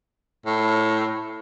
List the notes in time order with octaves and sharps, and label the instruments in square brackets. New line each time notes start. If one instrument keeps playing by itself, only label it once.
[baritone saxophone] A2